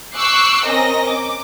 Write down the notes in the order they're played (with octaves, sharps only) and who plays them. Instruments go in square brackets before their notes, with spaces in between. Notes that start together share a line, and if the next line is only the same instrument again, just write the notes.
[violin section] C#6 D6 E6 F#6 G6 C7
C4 C#4 A#4 D#5 A#6
D6